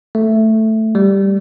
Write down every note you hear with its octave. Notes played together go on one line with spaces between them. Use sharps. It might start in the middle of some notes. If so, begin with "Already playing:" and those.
A3
G3